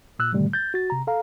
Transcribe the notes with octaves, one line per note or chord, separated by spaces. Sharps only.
A#2 E6 F#6
G#2 B2 D3 D#3 G3 A3
G6 A6
F#4 A6
C3 A#5
A4 F5 A#5